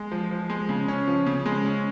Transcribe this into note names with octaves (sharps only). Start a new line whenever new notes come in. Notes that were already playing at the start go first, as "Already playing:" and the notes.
Already playing: G#3
F3
F3
G#3
C#3
C#4
F3
C#3
G#3
C#4